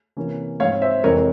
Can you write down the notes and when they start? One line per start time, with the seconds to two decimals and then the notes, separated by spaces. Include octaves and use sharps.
0.17 C3 E3 A#3 C#4
0.60 G#2 F3 C4 C#5 F5
0.82 C5 E5
1.04 F2 C3 E3 G#3 C4 A#4 C#5